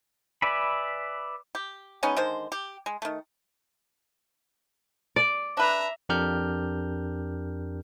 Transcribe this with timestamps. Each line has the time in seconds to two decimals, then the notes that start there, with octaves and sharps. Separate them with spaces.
0.42 B4 D5 E5 G#5 B5
1.55 G4
2.03 G#3 B3 C#4 D#4
2.16 D3 D#3 G#3 C5
2.52 G4
2.86 G#3
3.02 D#3 A3
5.16 D5
5.57 D4 B4 E5 A#5
6.09 F2 D4 G4 A#4 F6 G6